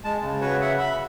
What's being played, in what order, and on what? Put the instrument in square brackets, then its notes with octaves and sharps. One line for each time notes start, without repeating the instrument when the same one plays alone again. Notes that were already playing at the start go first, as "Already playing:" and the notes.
[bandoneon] G#3 A5
C#3
[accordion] F#4 B4 C#5
E5 F#5
E5 B5